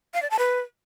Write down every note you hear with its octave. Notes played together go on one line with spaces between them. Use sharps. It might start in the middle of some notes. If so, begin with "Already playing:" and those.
F5
D5
A5
B4